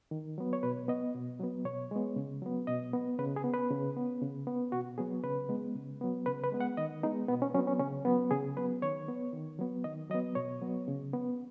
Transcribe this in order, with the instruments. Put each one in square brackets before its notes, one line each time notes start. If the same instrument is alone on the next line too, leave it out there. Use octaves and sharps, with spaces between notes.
[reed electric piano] D#3
F#3 B3
C#5
B2 B4
B3 D#5
B2
F#3 B3
B2 C#5
G#3 B3
C#3
F#3 B3
B2 D#5
B3
C#3 B4
G#4
B3
B4
C#3
B3
C#3
B3
B2 F#4
F#3 B3 G#4
C#3 B4
G#3 B3
C#3
F#3 B3
C#3 B4
B4
G#3 B3
F#5
D#3 D#5
G#3 B3 D#4
B2 B3
C#4
F#3 C#4
B3
C#4
C#3 C#4
F#3 B3
C#3 G#4
F#3 B3 B4
D#3 C#5
B3
D#3
F#3 B3
D#3 D#5
F#3 D#5
B3
B2 C#5
F#3 B3
C#3
B3